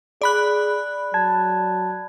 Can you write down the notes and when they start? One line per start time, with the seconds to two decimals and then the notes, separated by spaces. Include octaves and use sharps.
0.22 G#4 D5 B5 F#6
1.14 F#3 A5 G#6